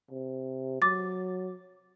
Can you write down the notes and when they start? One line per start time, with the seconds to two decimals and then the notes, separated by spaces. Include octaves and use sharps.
0.11 C3
0.82 F#3 D6 A6